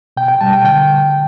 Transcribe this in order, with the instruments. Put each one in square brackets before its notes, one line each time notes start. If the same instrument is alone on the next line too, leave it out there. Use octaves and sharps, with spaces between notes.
[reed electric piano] B2 G5
G5
G3 A5
G5
D3 G5